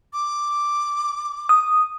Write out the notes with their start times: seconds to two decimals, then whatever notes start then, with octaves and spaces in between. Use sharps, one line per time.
0.13 D6
1.49 D#6